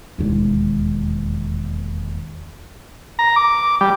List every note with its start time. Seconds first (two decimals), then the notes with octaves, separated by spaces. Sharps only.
0.18 E1 D#2
3.19 A#5
3.36 D6
3.81 G3